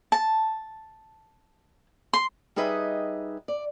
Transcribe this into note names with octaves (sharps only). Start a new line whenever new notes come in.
A5
C6
G3 D#4 G#4 B4 D#5 E5
D5